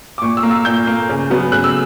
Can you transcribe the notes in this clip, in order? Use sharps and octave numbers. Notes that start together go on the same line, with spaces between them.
D6
A#2 C#6
E6
A#3
E6
A#2 G6
A#3
C#3
F#3 B3
C#3 F#6
E6